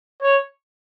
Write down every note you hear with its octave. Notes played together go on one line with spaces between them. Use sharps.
C#5